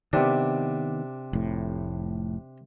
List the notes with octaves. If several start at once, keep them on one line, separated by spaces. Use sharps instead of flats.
C3 D#3 B3 D4
F1 A2